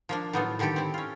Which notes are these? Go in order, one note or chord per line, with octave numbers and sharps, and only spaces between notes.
F3 A#3 D4
A2 F#3 B3 D#4 F4 A4
D3 D#3 G3 G4 A4
C4 E4
C#4 F4